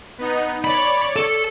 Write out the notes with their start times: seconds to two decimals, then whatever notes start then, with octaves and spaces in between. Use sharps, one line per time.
0.18 B3 D#4
0.64 C#5 D5 B5
1.16 A4